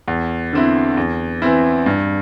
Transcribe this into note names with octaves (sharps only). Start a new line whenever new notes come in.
E2
D3 C4 E4
E2
E3 C4 E4
G2